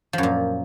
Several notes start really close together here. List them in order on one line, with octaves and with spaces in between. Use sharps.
F3 F#2 A#2